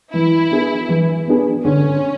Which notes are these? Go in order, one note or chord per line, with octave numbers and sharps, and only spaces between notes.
E3 E4
B3 D4 G#4
E3
B3 D4 G#4
D3 C#4